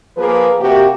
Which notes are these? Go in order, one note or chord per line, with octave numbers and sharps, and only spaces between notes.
F3 A#3 G#4 A#4 B4
C3 A#3 F#4 G4